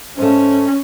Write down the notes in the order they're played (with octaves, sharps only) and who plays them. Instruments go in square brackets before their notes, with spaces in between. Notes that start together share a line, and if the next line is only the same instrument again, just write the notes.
[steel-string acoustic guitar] G#2 A3 [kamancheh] C#4